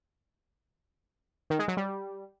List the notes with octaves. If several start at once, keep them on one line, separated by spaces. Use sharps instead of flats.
D#3
G#3
F#3
G3